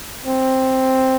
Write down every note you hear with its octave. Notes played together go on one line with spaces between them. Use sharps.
C4